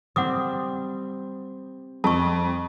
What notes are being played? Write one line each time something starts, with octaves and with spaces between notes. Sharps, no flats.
G3 C4 F#5 D6 D#6
F2 A5 C#6